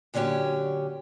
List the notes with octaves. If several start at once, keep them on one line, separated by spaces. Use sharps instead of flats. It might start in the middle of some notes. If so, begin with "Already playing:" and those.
A#2 D3 F#3 C#4 G4